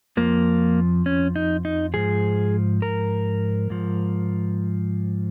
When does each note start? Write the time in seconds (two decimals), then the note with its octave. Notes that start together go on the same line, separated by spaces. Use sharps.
0.17 F2 F3 A#3
1.06 C#4
1.36 D#4
1.65 D#4
1.94 G#2 F3 G#4
2.82 A#4
3.70 G#2 F3